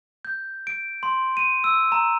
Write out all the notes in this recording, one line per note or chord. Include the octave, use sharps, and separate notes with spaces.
G6
D7
C6
D#7
E6
A#5